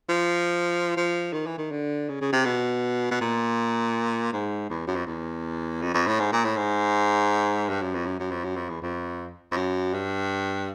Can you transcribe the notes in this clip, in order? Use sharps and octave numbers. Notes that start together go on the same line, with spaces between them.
F3
F3
D#3
E3
D#3
D3
C#3
C#3
C3
B2
B2
A#2
G#2
E2
F#2
F2
E2
F2
F2
A2
G#2
A#2
A2
G#2
G2
F#2
F2
F#2
F#2
F2
F#2
F2
E2
F2
F2
F#2
G2